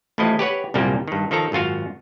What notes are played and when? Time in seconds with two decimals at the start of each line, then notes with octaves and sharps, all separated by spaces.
0.18 A1 A2 F3 E4 D#5
0.39 G4 B4 C#5 F#5
0.74 C2 F#2 A#2 G3 A#3 G4
1.08 G2 D#3
1.31 D#3 F3 A4 A#5
1.52 G#1 F#2 F4 F#4 F5